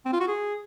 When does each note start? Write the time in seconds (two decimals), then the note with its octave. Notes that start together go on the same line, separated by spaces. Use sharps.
0.05 C4
0.13 F4
0.20 F#4
0.27 G#4